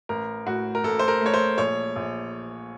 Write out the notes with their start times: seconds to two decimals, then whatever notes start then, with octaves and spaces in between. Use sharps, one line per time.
0.09 A1 A#4
0.46 A2 F#4
0.75 A#4
0.83 A1 A4
0.99 C5
1.08 A#4
1.21 A3 C#5
1.34 C5
1.58 A#1 C#5
1.96 A#1